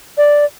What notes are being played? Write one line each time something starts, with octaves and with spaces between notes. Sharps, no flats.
D5